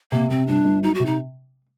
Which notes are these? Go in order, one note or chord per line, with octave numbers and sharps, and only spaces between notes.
C3 A#3
C3 C4
G1 D4
G1
F#3 D#4
F#4
C3
D#4